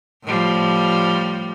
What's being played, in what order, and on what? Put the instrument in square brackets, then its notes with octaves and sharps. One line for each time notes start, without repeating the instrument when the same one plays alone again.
[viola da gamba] A2 F3 G3